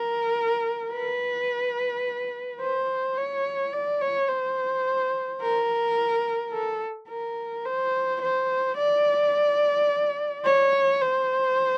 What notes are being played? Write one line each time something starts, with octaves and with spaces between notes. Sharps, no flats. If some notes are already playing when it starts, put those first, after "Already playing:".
Already playing: A#4
B4
C5
C#5
D5
C#5
C5
A#4
A4
A#4
C5
C5
D5
C#5
C5